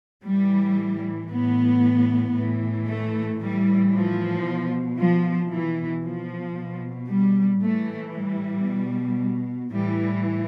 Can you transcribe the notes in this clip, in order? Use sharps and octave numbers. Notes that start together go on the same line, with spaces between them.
A2 E3 G3
A2 E3 B3
A2 E3
A3
A2 E3 G3
F3
B2
F3
B2 E3
F3
B2
G3
A2 E3 A3
G3
B2
A2 E3 G3